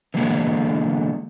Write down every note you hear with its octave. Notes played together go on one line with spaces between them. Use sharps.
D3 E3 F#3 G#3 A#3 B3